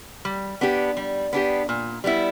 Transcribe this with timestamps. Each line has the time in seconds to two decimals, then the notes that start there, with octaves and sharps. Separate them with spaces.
0.25 G3
0.61 B3 D4 G4
0.97 G3
1.33 B3 D4 G4
1.69 A#2
2.04 G3 B3 E4